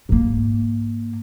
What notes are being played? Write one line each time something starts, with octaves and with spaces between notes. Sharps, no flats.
G#2 A#3